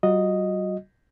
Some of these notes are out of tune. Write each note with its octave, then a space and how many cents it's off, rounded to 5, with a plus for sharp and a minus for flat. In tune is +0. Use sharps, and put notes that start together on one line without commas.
G3 -45 F#4 -40 D#5 +0